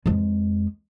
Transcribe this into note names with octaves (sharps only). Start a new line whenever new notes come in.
F2 G#3